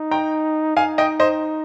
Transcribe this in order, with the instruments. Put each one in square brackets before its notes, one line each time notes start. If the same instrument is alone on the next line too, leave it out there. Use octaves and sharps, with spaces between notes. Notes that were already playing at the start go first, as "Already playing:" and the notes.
Already playing: [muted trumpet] D#4
[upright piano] G5 A#5
[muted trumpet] D#4 [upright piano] F5 G#5
[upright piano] D#5 G5
C5 D#5